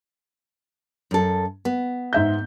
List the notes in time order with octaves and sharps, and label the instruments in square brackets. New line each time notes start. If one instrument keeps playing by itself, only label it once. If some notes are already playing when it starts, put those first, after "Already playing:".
[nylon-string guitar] F#2 A4
B3
[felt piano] G#2 E5 G6